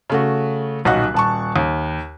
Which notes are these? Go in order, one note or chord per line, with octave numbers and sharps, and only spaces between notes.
C#3 A3 F#4
D#1 B1 D#4 F#4 F#5 F#6
D#1 A5 C#6
D#2